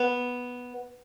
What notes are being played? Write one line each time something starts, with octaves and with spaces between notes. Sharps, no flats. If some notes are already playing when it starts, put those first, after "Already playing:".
Already playing: B3